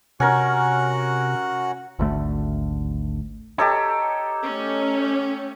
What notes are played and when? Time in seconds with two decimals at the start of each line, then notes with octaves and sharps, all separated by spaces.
0.20 C3 C#4 F#4 A#4 F#5
1.99 G#1 D2 A3
3.58 D#4 G4 A4 C#5
4.45 A3 C#4